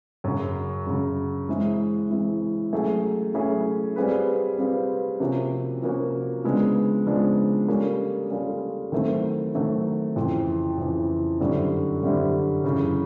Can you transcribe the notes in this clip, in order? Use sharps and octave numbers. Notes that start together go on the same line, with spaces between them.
F#2 C#3 F#3
F#2 C#3 F#3
E3 G#3 C4 E4
E3 G#3 C4 E4
F#3 A3 C#4 E4 G#4
F#3 A3 C#4 E4 G#4
G3 C4 F4 G#4 B4
G3 C4 F4 G#4 B4
C3 F3 A#3 C#4 F#4
C3 F3 A#3 C#4 F#4
C#3 F3 G#3 B3 D4
C#3 F3 G#3 B3 D4
G3 A#3 C#4 F4 A4
G3 A#3 C#4 F4 A4
D#3 F#3 A3 C4 E4
D#3 F#3 A3 C4 E4
F2 C#3 E3
F2 C#3 E3
F#2 D3 G3 C4 E4
F#2 D3 G3 C4 E4
F#2 C#3 E3